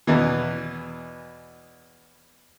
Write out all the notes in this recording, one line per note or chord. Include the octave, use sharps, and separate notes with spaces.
E2 B2 E3